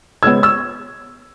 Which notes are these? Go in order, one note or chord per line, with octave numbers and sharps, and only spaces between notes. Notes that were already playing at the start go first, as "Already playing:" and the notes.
C#3 G#3 B3 E6 G#6
C#6 E6